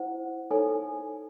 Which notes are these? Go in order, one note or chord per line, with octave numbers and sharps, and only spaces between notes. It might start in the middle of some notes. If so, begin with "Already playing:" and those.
Already playing: E4 C5 F#5
D#4 A4 C#5 G#5